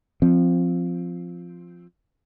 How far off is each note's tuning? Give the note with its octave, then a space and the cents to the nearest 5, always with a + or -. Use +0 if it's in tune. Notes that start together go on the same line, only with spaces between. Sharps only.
F3 +0 C4 +0